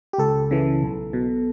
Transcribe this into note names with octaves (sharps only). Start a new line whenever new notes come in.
G4
C#2 A4
C#3 E3
B1
B2